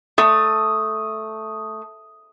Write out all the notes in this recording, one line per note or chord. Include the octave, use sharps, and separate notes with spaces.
A3 D#6